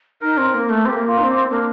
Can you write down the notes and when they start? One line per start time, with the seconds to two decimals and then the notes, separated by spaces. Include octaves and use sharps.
0.21 D#4 A#4
0.38 C4
0.54 A#3
0.70 A3
0.86 A#3 C4 G4
1.08 F4
1.19 D#4
1.24 C4
1.29 A#3
1.50 A#3 D4